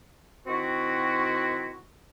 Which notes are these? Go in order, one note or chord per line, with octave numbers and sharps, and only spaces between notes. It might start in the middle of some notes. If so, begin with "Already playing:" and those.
D#3 C4 E4 F#4